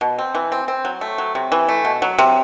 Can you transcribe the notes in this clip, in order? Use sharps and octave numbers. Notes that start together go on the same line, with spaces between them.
B2
C4
E3
C4
C4
F#3
A3
F#3
C3
E3
A3
B2
F#3
C3